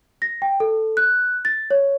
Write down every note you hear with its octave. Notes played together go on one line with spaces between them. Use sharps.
A#6
G5
A4
F#6
A6
C#5